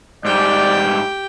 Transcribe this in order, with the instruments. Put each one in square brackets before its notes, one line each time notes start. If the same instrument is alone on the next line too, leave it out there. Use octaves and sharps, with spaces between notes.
[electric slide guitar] G#2 G3 [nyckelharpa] G4 G5 [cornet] D5